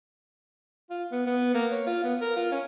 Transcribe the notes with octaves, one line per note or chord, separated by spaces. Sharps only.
F4
B3
B3
A#3
C#5
F4
B3
A#4
F4
C#4